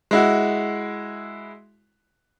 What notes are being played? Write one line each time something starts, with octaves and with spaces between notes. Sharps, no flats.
G#3 E4 F#4